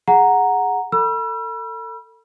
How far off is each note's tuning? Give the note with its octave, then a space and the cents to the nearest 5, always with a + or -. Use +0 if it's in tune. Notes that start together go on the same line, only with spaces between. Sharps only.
G#4 +0 F#5 -5 A#5 +0
A4 +35 B5 -35 E6 +40